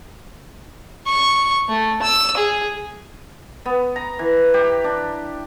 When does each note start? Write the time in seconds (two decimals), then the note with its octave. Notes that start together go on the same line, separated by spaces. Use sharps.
1.07 C#6
1.69 A3
2.03 E6
2.37 G#4
3.66 B3
3.96 A#5
4.19 E3
4.54 G4
4.84 D4